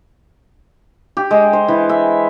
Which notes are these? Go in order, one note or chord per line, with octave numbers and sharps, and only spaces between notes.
G4
G#3
C5
E3
E5